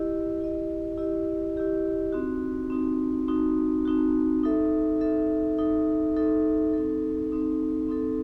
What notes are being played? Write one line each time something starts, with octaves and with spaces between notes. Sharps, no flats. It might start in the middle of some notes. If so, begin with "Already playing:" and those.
Already playing: E4 G4 D#5
E4 G4 D#5
E4 G4 D#5
E4 G4 D#5
C4 D#4 F#4
C4 D#4 F#4
C4 D#4 F#4
C4 D#4 F#4
D#4 A4 E5
D#4 A4 E5
D#4 A4 E5
D#4 A4 E5
C4 D#4 A4
C4 D#4 A4
C4 D#4 A4